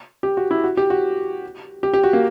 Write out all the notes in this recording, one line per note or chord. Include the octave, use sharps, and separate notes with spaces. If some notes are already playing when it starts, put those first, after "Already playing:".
G4
F#4
E4
F#4
G4
F#4
G4
G4
F#4
A#3